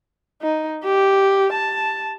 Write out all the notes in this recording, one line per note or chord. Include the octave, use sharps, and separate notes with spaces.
D#4
G4
A5